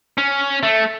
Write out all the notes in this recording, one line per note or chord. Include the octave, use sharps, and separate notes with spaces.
C#4
A3